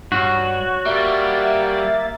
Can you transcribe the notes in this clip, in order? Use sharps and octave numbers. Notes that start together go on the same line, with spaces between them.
G2 F#4 C#5
G3 A#3 E5 A6